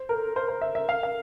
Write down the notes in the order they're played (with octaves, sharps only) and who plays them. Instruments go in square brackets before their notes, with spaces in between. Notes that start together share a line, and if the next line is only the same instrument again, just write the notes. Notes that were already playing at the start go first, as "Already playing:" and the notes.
Already playing: [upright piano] C5
[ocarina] A4 [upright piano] A#4
[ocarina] A#4 [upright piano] C5
[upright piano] C5
E5
E5
F5
F5